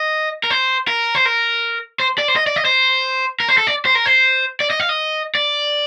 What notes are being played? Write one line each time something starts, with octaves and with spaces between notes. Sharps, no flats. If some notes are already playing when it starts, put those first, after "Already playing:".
Already playing: D#5
A#4
C5
A#4
C5
A#4
C5
D5
C5
D#5
D5
D#5
C5
A#4
C5
A4
D5
C5
A#4
C5
D5
D#5
F5
D#5
D5